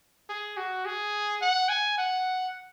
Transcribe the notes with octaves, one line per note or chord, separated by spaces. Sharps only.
G#4
F#4
G#4
F#5
G#5
F#5